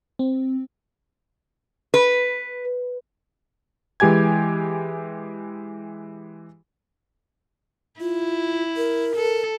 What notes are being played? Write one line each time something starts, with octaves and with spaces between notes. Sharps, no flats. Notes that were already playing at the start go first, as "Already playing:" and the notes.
C4
B4
E3 G#3 G4 G#5 G#6
E4 F4
A#4
A4